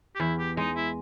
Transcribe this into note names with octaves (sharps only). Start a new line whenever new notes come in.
G4
E2 E4
G4
G#3 D#4
E4